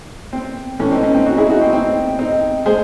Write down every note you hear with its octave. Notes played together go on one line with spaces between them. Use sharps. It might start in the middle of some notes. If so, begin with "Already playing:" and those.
C4
A2 E3 A3 C#4
C4 D#4
C#4
C4 D#4
D#4 F#4
E4 G#4
D#4 F#4
C4
C4 D#4
C4 D#4
G#3 G#4 C5